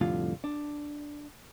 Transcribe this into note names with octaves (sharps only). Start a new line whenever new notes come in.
C2 F2 A2 D3 F4
D4